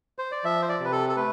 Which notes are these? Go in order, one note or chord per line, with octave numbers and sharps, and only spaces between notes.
C5
D5
F3 E5
C5
D5
C3
B4
A4
A4
A3 B4